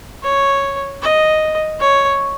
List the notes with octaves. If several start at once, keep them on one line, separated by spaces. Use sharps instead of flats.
C#5
D#5
C#5